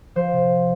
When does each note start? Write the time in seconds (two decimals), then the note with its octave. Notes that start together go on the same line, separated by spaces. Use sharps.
0.16 F3 C5
0.33 C3